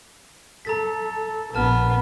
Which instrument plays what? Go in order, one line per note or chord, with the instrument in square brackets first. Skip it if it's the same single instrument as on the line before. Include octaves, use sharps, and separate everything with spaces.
[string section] A4 [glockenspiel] A#5 A6 B6
[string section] A#1 [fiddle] B3 [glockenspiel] A5 F6